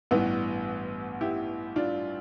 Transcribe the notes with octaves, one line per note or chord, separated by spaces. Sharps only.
A1 G2 E3 B3
E4 G4
D4 F4